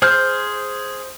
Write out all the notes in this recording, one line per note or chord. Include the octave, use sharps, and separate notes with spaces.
G#4 C5 F6 G6